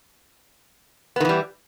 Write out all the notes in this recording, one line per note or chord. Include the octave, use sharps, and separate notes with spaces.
D#3 E3 G3 B3